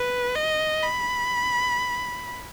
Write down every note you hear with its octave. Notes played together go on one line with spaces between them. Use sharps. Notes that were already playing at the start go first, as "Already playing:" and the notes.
Already playing: B4
D#5
B5